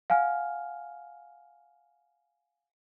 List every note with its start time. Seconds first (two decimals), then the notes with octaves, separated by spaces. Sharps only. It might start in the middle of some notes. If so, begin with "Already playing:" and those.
0.10 F5 F#5 G#5 F6